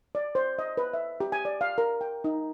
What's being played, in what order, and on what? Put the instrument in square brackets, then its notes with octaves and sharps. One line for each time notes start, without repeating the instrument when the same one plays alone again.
[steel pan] D5
C5
D#5
B4
E5
G4
G#5
D5
F5
A#4
G5
D#4